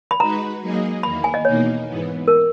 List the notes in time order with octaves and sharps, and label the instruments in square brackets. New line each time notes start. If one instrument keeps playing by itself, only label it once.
[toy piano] B5
[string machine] G#3 D#4 F#4 B4 [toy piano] A#5
[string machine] F#3 A#3 D#4 G#4 D#5
[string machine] E2 D#3 A#3 [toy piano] B5
[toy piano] G#5
D#5
[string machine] E2 B2 A#3 D#4 [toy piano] C#5
[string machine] G#2 E3 B3
[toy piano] A#4